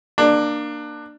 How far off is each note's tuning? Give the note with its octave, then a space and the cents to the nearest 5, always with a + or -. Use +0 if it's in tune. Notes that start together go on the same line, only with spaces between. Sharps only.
A#3 +0 D4 +20